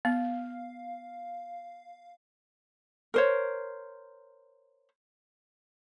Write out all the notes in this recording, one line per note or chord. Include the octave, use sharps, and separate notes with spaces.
B3 F5
A#4 C5 C#5